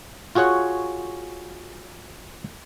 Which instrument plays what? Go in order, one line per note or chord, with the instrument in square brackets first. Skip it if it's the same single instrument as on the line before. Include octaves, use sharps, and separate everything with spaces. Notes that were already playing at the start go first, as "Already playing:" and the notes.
[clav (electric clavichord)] F4 F#4 G#4 C#5 F#5